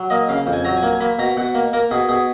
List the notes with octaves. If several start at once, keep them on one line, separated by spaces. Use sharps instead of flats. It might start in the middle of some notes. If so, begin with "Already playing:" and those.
Already playing: F#3
A#3 D#5
C#3 F5
F2
G#5
F#3 A#5
G#5
A#3
G#5
A#3 B5
B2 A#5
B2 F#5
A#3
A#3 A#4
B2 G#4
B2 G#4